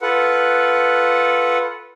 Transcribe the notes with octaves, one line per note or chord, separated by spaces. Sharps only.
F4 A4 B4 F#5